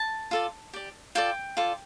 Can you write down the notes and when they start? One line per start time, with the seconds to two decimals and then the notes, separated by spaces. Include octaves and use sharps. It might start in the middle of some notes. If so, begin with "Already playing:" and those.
Already playing: A5
0.31 F4 A4 D5
0.73 G4 D5
1.15 F4 A4 D5 G5
1.57 F4 A4 D5